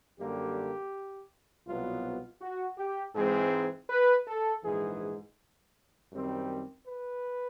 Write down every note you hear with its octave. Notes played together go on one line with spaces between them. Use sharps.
F#2 D3 G3 A#3 G4
C2 B2 F#3 B3 F4
F#4
G4
G#2 E3 G#3 C4 G#4
B4
A4
A#1 G#2 E3 G#4
F#2 D#3 G3 C4
B4